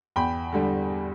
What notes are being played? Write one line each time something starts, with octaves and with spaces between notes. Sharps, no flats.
E2 G5 B5
D3 G3